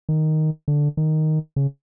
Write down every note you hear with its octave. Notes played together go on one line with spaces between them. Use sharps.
D#3
D3
D#3
C#3